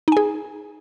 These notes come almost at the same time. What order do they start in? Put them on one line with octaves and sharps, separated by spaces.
D#4 G#5 G#4